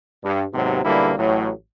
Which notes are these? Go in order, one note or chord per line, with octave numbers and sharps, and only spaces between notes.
G2
D#2 G#2 C3 F#3 B3 C5
B1 D3 G3 A#3 E4 B4
A1 A2 F#3